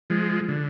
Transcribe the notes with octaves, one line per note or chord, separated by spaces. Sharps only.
F3 G#3
D3